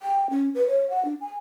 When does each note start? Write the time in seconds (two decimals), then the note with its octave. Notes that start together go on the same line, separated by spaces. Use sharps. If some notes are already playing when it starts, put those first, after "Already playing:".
0.02 G5
0.30 C#4
0.55 B4
0.67 C#5
0.90 F#5
1.05 D4
1.21 G#5